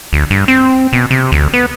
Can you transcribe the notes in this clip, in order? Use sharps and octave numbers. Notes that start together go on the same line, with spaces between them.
D2
G2
C4
B2
C3
D2
B3